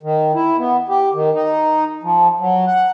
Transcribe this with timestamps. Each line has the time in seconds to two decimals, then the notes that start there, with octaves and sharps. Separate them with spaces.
0.03 D#3
0.35 E4
0.59 B3
0.89 G4
1.14 D#3
1.35 D#4
2.03 F3
2.40 F#3
2.67 F#5